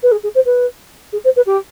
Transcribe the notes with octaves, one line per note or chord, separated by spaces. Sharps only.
B4
G#4
G#4
C5
B4
G#4
C5
B4
G4